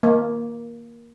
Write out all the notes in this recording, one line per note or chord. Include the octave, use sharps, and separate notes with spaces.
A#3